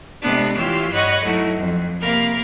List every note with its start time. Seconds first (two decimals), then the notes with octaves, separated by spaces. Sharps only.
0.22 C3 G#3 A3 B3 D4
0.56 E3 F4 G4 C#5 E6
0.92 G2 B4 C#5 D#5 F#5 C#6
1.24 F#3 A3 D#4 E4 F#4
1.58 F2
2.01 C3 A#3 A#4 F5 B5